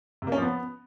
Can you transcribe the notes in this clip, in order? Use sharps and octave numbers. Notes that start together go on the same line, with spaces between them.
C3
A#3
C#4
F3
B3